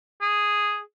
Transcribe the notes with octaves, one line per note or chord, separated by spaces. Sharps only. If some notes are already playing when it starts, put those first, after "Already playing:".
G#4